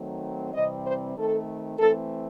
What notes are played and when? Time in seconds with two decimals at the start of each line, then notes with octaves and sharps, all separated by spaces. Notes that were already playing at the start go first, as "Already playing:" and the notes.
Already playing: D#3 F#3 A3 C4
0.54 C3 E3 G3 C4 D#5
0.85 C5
1.16 D#3 A3 C4 A4
1.79 E3 A3 C4 A4